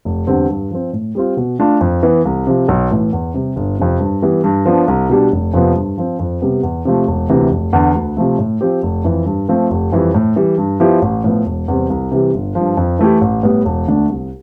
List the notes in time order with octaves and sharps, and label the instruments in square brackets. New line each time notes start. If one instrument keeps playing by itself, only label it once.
[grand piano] F1
E2 D3 G3 C4
G2
F3 C4
A2
G3 C4 F4
B2
A3 D4 F4
F2
E3 B3
C2
C3 F3
B1
A2 E3
E2
C3 G3
G1
F2 C3
G2
E3 G3 B3
G2
F3 B3 D4
C2
B2 G3 D4
F1
F2 C3 F3 B3
G2
F3 C4
F2
C3 G3 B3
E2
C3 F3 A3
E1
D2 C3 E3
F1
E2 D3
D2
C3 F3 A3
A2
F3 C4 G4
F1
F2 E3
G2
F3 A3 C4
F1
F2 E3 G3
A2
E3 G3
G2
F3 B3 E4 G4
A1
A2 F3 B3
E1
E2 C3 G3 C4
C2
C3 E3 G3
G1
G2 F3
F2
E3 A3 E4 G4
A1
A2 G3 B3
E1
D2 D3 A3 D4
C2